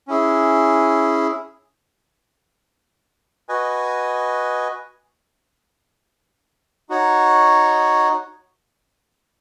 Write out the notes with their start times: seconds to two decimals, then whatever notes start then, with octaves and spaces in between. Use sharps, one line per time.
0.08 C#4 E4 G#4
3.49 F#4 B4 D#5 G#5
6.89 D#4 F#4 C#5